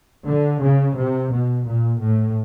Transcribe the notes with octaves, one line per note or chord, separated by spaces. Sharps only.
D3
C#3
C3
B2
A#2
A2